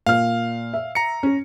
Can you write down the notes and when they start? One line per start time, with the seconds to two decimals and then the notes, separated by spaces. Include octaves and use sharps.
0.06 A#2 F5 F6
0.74 E5
0.95 A#5 C#7
1.23 C#4